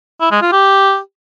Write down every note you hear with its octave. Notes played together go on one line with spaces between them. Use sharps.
E4
G#3
F4
G4